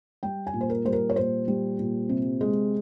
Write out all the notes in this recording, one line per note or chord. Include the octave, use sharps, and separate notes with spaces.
G3 G5
G#5
A#2
C5
A#4
G3 C5
A#4
C#5
A#2 C5
G3
A#2
C3
G#3